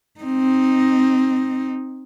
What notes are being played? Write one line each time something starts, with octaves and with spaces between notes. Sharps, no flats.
C4 D#4